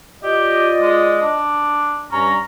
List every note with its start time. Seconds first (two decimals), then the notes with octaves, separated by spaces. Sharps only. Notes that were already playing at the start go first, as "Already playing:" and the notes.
0.23 F4 G4 D5 D#5
0.82 G#3
1.22 D4
2.12 G2 C#4 A#5